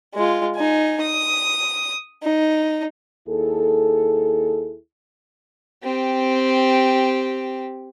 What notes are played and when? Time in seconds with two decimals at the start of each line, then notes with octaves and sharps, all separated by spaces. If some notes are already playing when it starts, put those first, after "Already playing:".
0.14 G#3 F4
0.56 D#4 G#5
1.01 D#6
2.23 D#4
3.27 D#2 E4 G#4 A4
5.83 C4 G4